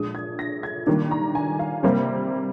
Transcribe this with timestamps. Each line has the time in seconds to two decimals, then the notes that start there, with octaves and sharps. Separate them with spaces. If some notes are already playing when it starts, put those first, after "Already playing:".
Already playing: A#2 F3 G#3 D4 D#6
0.15 G#6
0.39 A#6
0.63 G#6
0.87 D#3 G3 A#3 D4
1.11 A#5
1.35 G#5
1.59 F5
1.83 C3 G3 A#3 C5